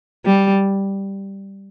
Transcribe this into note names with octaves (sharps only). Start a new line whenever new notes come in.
G3